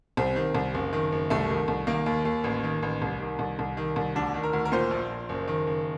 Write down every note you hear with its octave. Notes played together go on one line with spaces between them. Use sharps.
C2 C4
D#3
C2
F#1
D#3
F#1
C2 A3
D#3
C2
D#3 A#3
D#2
D#2
A1
D#3
A1
C2
D#3
C2
C2
D#3
C2
D2 D4
D#3
A#4
D2
A#4
A#2 C5
A#1
A#1
F#1
D#3
F#1